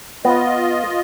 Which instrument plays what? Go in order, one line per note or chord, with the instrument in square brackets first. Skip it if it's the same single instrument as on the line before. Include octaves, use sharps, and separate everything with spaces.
[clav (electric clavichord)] B3 [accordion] F4 D#5